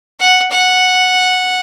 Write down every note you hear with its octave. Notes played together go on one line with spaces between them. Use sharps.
F#5
F#5